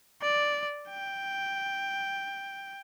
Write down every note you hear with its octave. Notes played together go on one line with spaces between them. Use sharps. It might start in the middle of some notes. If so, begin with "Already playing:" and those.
D5
G5